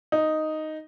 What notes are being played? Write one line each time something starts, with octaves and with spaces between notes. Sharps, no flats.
D#4